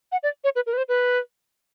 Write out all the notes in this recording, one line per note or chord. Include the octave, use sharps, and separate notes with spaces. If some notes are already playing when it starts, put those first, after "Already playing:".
F#5
D5
C#5
B4
A#4
B4
C5
B4